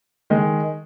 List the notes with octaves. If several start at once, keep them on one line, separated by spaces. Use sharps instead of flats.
D#3 G#3